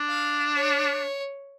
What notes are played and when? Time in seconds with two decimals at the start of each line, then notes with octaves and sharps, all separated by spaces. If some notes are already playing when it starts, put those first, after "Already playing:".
Already playing: D4
0.08 F5
0.55 C#5